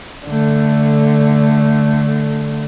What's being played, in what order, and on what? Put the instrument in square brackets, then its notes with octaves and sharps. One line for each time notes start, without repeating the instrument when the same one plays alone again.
[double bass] D3 A3